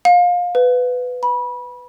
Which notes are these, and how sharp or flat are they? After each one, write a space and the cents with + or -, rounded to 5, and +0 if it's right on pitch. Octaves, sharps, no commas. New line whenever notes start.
F5 +25
B4 +15
B5 -25